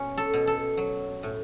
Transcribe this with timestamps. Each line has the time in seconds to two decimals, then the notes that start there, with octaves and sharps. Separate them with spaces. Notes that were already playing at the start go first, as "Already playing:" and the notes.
Already playing: B2 C#4
0.18 A4
0.34 B2
0.47 A4
0.77 F#3
1.23 A2